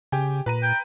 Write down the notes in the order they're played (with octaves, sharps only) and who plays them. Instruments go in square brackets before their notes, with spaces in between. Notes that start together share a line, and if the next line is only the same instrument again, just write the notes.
[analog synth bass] C#3 [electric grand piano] G4 G5 G#5
[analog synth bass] A#2 [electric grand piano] B4 A#5 D#7
[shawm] G5